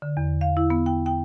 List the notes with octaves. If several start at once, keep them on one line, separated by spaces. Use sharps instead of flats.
D3
E2
F5
E4
B3
G5
G5